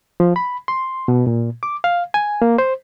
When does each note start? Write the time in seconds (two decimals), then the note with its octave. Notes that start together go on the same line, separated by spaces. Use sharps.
0.20 F3
0.36 B5
0.68 C6
1.08 B2
1.27 A#2
1.63 D6
1.84 F5
2.14 G#5
2.42 A#3
2.58 C5